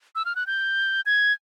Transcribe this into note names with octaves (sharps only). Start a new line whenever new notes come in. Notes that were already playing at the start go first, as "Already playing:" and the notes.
E6
F6
F#6
G6
G#6